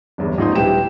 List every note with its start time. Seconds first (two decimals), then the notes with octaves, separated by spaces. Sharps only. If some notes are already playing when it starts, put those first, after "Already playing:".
0.18 G1 E2 G2
0.38 A1 F3 D#4 C6 D#6
0.55 D#1 E4 G4 B4 G5 E7